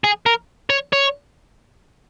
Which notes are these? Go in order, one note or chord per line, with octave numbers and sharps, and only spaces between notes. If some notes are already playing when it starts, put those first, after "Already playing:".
G#4
A#4
C#5
C#5